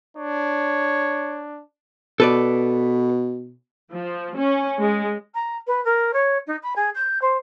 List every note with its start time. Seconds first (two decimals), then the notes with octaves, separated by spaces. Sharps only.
0.17 D4 C#5
2.20 B2 A4 B4 D5
3.92 F3
4.36 C#4
4.81 G#3
5.34 A#5
5.67 B4
5.84 A#4
6.13 C#5
6.47 D#4
6.62 B5
6.75 G#4
6.94 G6
7.21 C5